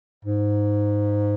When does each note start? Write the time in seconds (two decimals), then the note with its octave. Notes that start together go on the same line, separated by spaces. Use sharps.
0.24 G#2